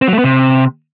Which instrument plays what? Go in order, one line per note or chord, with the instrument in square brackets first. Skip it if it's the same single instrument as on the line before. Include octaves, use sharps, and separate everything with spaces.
[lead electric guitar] C4
F#3
A3
B3
C3